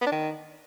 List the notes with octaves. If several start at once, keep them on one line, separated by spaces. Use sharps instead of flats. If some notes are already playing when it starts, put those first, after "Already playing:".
B3
D4
D#3